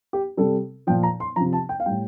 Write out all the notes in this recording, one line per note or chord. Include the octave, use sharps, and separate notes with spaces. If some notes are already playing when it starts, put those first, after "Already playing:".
G4
C3 G3 A4
A#2 F3 G5
A#5
C6
C3 F3 A#5
A5
G5
F5
A2 G3 G5